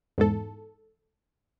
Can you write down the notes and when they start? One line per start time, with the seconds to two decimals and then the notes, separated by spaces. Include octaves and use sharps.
0.18 E2 G#2 A4